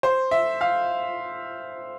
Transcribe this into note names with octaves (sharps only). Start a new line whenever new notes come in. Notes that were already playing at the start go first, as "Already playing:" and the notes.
C5
E5
F5